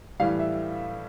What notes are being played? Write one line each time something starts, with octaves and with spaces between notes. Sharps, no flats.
A2 E3 G3 F5
E5